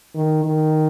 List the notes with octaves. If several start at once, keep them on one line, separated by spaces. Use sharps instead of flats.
D#3
D#3